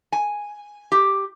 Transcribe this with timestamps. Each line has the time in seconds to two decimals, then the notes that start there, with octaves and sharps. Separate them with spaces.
0.12 G#5
0.92 G4